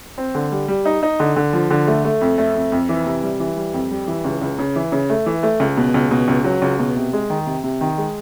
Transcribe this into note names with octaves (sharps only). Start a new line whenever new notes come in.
C4
D3
G3
G3
D#4
D#4
D3
D3
F3
D3
A3
A3
F2
A3
F2
F2
E3
C3
G3
E3
G3
F2
G3
E3
C#2
C#2
C#3
E3
C#3
A3
E3
A3
C#2
B2
C#2
B2
C#2
F#3
C#2
B2
C3
G#3
D#3
C3
C3
D#3
G#3